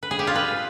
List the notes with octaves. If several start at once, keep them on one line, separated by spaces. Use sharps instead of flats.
B4
G#4
G4
F4
B4